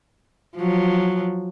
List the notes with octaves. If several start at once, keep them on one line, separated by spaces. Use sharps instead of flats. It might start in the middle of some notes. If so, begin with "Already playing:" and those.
F3 F#3